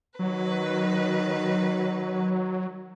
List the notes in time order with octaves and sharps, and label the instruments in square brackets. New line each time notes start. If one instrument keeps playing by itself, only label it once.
[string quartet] D#3 B4 [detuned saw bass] F#3